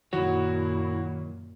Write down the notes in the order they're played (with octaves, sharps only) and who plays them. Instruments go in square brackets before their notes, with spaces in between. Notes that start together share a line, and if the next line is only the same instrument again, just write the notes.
[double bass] F#2 A#2 [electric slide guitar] D#3 F#3 C#5 [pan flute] E4 [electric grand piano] F#4